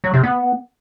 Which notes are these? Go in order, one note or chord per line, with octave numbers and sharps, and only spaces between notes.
F#3
C3
B3